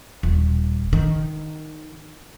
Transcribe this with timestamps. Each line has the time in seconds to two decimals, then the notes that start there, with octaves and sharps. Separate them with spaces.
0.23 D#1
0.93 D#3